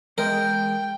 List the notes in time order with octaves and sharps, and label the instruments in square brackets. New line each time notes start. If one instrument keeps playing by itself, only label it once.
[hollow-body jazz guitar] E2 G#3 D#5 [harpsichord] A#4 [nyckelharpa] G5